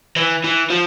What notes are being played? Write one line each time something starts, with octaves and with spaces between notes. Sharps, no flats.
E3
E3
F3